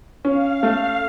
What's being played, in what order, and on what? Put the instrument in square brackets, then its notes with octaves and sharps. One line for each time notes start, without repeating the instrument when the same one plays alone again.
[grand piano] C#4 [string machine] F5
[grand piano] A3